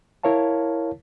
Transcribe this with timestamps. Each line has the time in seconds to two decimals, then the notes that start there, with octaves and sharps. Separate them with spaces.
0.23 E4 A#4 C#5 F5 A5